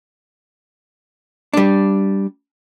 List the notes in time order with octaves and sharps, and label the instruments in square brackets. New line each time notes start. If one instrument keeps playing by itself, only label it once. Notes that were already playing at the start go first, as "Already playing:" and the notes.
[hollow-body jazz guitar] G3 D4